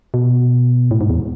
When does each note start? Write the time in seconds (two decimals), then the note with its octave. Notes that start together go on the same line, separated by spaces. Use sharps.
0.14 B2
0.91 A2
1.01 G#2
1.10 E2